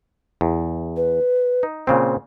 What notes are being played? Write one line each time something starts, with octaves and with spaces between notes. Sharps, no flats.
E2
B4
D#4
A#2 C#3 C4 C5